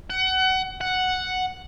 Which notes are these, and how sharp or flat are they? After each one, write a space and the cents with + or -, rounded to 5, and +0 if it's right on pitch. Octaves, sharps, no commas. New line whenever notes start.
F#5 +25
F#5 +0